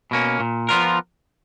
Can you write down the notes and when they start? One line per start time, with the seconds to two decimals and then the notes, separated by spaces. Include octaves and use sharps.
0.11 B2 A#3 C#4
0.40 A#2
0.69 F3 B3 F4 A#4